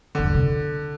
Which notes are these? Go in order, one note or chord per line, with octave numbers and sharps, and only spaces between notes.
F2 D3
G2
C3